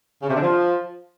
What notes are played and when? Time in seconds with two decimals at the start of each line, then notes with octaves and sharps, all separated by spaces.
0.22 C#3
0.29 C3
0.35 D3
0.42 F3